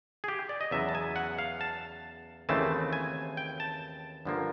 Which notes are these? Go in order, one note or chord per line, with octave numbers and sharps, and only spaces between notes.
G#4
G4
D5
D#5
E2 C#3 F#3 B3 E5
A5
G#5
F#5
F5
A5
D#2 C#3 E3 A3 C4 A5
G#5
G5
A5
G2 D3 F3 A#3